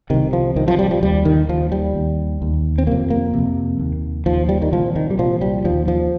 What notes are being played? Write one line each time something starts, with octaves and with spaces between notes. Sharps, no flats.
C2 C3 D#3
F3
C2 C3 D#3
F3
G3
F3
D#2 G3
D#3
D#2 F3
G3
D#2
D#2
C4
F2 C3 A#3
A#3
F2 C3
D#2
D#2 F3
G3
D#3
C2 A#2 F3
D#3
G3
C2 A#2 F3
G3
D#2 F3
F3